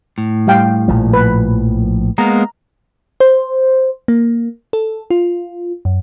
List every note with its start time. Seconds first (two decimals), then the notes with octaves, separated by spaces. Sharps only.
0.18 A2
0.47 G3 F5 G5
0.88 A#1 A#2 F3
1.13 B4
2.18 G#3 A#3 B3 A#5
3.20 C5
4.08 A#3
4.73 A4
5.10 F4
5.85 F#2